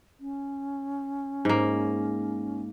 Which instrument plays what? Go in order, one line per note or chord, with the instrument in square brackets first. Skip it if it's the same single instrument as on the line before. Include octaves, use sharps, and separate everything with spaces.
[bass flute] C#4
[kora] G#2 A#3